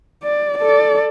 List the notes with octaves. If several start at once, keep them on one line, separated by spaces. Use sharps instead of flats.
D5
A4 D5